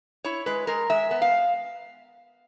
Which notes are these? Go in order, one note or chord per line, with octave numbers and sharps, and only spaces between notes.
E4 C#5
G#3 B4
G#3 A#4
G#3 E5
B3
F5